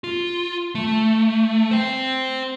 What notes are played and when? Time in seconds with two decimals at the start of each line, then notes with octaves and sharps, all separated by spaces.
0.04 F4
0.75 A3
1.71 C5 G5